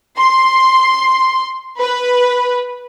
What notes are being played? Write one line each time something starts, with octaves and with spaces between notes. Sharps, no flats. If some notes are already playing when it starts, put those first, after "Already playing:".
C6
B4